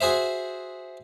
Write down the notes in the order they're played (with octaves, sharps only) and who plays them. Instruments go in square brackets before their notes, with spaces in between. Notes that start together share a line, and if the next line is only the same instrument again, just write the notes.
[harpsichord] F#4 G#4 C5 E5